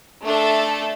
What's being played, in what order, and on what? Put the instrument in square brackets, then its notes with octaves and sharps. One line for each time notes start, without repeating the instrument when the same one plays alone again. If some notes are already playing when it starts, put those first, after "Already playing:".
[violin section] A3 D4 A4